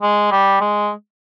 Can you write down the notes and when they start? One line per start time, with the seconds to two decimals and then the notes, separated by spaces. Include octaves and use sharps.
0.02 G#3
0.32 G3
0.61 G#3